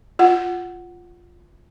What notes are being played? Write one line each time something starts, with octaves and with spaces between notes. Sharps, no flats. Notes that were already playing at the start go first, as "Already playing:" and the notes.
F4 F#5